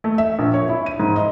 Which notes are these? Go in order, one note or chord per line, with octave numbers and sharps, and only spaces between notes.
A3
E5
A#1
C#5
E4
D#7
G#2
D#5